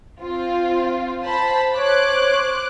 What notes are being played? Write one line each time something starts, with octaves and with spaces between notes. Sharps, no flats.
C4 F4
C5 A5 B5
C5 C#5 D6 F#6